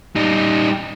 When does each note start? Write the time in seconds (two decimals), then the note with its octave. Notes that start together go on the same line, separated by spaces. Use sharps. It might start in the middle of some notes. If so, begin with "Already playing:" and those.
0.15 G3 D#4